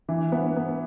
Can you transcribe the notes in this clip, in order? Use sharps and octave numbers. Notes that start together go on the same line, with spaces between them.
E3
B3
B3